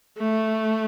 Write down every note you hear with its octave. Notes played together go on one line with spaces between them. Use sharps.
A3